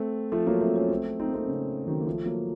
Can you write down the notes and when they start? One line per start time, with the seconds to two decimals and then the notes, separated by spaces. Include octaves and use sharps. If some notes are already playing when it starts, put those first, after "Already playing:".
Already playing: A3 C4
0.32 F3 A3
0.47 F#3 A#3
0.61 A3 C4
0.75 A#3 C#4
0.90 A3 C4
1.19 C4 D#4
1.28 A#3
1.34 A3 C4
1.48 C#3
1.87 D#3 F#3
2.01 A#3
2.06 F3 A3
2.26 F#3 A#3